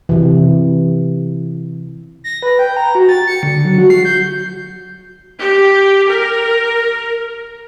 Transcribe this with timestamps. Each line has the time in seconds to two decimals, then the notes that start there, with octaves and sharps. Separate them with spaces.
0.09 C3 E3
2.24 A#6
2.42 B4
2.59 G5
2.77 A#5
2.95 F#4
3.09 A6
3.27 C#7
3.43 D3
3.65 F#3
3.78 F#4
3.90 C7
4.05 G6
5.38 G4
6.07 A#4